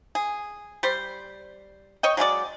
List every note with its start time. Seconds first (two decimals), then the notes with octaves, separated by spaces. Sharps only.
0.15 G#4
0.83 G3 C5
2.03 C#5 D#5 G5
2.17 F#3 G#3 E4 D5